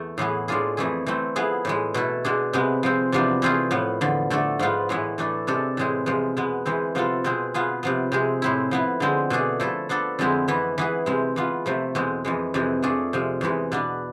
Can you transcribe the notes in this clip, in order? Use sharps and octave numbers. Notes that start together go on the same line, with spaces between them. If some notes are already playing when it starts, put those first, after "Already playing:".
Already playing: E2 A3
A2 E3 B3 E4 G#4
A2 G#3 D4 F4 G#4
F2 E3 A3 E4 G#4
E3 A3 C4
F3 B3 E4 G#4
A2 E3 G#3
B2 A3 E4 A4
B2 G#3 D4 G#4
C3 G#3 B3
F3 G#3 C4
E2 C3 F3 B3 D4
E3 A3 C4 F4 G#4
A2 F3 B3
E2 D3 F3
D3 A3 D4 A4
G#2 F3 B3 F4
A2 E3 G#3 B3 E4
E3 A3 D4 A4
C3 G#3 D4 A4
A2 E3 G#3 C4 G#4
E2 C3 F3 G#3
B2 G#3 B3
E3 G#3 C4
C3 F3 B3 F4 A4
B2 G#3 C4 G#4
B2 B3 F4 G#4
C3 F3 B3
C3 G#3 C4 G#4
A2 G#3 C4 E4
F3 B3 E4
D3 G#3 C4
B2 A3 D4 G#4
F3 A3 E4 A4
F3 B3 D4 A4
F2 D3 G#3 C4 E4
F2 E3 B3 E4
E3 B3 E4 G#4
C3 G#3 C4
E3 B3 F4
C3 F3 A3
E2 B2 G#3 C4
F2 E3 G#3
F2 C3 E3 G#3
F3 A3 D4 G#4
C3 F3 G#3
E2 C3 E3 G#3
B2 B3 D4